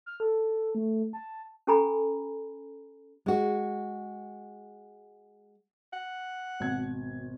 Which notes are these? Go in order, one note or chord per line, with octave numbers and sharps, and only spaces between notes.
F6
A4
A3
A5
C#4 G4 A4 G#5 A#5 B5
G#3 F#4
F#5
G#1 B2 G#6